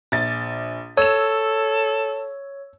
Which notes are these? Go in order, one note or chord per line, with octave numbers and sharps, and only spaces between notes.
A#1 A6
A4 C#5 E6 E7